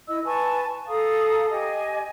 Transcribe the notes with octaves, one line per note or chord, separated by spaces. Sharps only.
E4 D#5 E6
B4 G#5 A5 C#6
A4 F5 A#5 D#6
G4 D#5 G#5